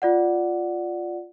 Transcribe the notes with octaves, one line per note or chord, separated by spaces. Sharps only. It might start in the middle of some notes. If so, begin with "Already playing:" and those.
F4 D5 F#5